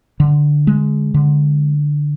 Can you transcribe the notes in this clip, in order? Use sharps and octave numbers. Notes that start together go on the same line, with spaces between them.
D3
G#3
D3